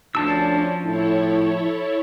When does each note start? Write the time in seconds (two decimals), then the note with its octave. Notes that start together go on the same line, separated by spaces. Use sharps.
0.15 D2 F3 C#4 D4 A5 E6
0.85 A2 E4 A4 C#5